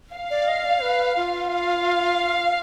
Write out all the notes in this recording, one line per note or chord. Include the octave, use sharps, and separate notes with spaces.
F5
D5
D#5
D5
B4
F4
F5